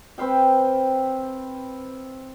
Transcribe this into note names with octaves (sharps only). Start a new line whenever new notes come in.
C4 B4 F5 G5